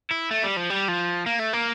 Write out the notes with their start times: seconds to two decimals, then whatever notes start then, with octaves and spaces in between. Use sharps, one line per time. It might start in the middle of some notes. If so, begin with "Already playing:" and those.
0.11 E4
0.31 A3
0.43 G3
0.57 F3
0.70 G3
0.88 F3
1.26 A#3
1.40 A3
1.53 A#3